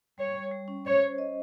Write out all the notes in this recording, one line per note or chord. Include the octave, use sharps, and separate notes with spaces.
G3 C#5
G3
G3
C#4
C5 C#5
C5
D#5